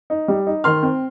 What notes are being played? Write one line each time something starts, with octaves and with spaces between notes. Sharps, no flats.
D#4
G3
D#4
D#3 C6 F6
C4